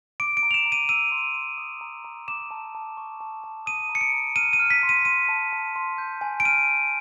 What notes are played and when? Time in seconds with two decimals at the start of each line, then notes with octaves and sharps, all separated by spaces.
0.20 D6 D7
0.37 D7
0.43 A#5
0.51 F7
0.54 E7
0.66 A#5
0.72 D#7
0.89 E6 D#7
1.12 C6
1.35 C6
1.58 D#6
1.81 A#5
2.05 A#5
2.28 D6 E7
2.51 A5
2.75 A5
2.97 C#6
3.20 A5
3.44 A5
3.66 D#6 D#7
3.89 A#5
3.95 C#7
4.01 D7
4.13 A#5
4.36 F6 D#7
4.53 D#7
4.59 F6
4.70 B6
4.83 C6
4.89 D#7
5.05 C6 D#7
5.29 A5
5.52 A5
5.76 C6
5.98 G6
6.21 G#5
6.40 D7
6.45 F6 D#7
6.68 F6